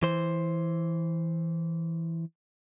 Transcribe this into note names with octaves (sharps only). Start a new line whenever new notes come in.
E3 C5